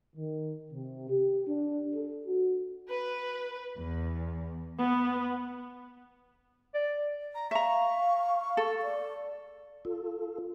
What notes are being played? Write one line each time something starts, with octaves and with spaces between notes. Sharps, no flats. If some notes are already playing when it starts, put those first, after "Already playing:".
D#3
C3
G4
D4
A4
F#4
B4
E2
B3
D5
A#5
E5 F5 A#5 C#6
A4
D5
F4 A4